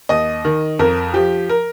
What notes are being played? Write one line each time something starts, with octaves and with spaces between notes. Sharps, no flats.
D#2 D#5
D#3
F2 A#4
F3 G4
A#4